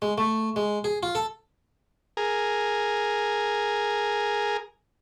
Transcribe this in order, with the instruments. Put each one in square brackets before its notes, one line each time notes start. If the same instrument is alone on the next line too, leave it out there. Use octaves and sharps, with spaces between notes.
[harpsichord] G#3
A3
G#3
G#4
F4
A4
[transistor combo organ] G#4 A#4